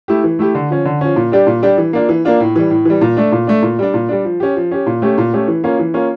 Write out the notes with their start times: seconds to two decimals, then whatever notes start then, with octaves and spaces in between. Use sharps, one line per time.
0.08 A3 E4 G4
0.24 E3
0.39 A3 E4 G4
0.55 D3
0.70 F3 C#4
0.85 D3
1.01 F3 C#4
1.16 A#2
1.32 G3 D4 G4
1.47 A#2
1.62 G3 D4 G4
1.78 E3
1.93 A#3 D4 F4
2.09 E3
2.25 A#3 D4 F4
2.40 A2
2.56 E3 G3
2.70 A2
2.85 E3 G3
3.01 A#2
3.17 A3 D4
3.32 A#2
3.47 A3 D4
3.63 A#2
3.79 G3 D4
3.94 A#2
4.09 G3 D4
4.25 F3
4.40 C#4 G4
4.56 F3
4.71 C#4 G4
4.86 A#2
5.02 A3 C#4 G4
5.18 A#2
5.33 A3 C#4 G4
5.48 E3
5.64 A#3 C#4 F4
5.79 E3
5.94 A#3 C#4 F4